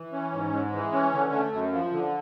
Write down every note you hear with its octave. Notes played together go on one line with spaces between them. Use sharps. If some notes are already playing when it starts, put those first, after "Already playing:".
Already playing: E3
C#4
G#2
G#3
E3
C#4
D3
A3
F#2
F3
D3